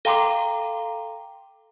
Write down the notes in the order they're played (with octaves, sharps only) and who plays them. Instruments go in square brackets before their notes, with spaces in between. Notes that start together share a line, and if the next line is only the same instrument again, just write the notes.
[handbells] A4 F5 G5 A#5 C6 D6